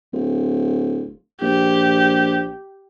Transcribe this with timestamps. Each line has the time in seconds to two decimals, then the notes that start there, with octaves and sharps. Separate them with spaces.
0.13 D1
1.42 A#1 G4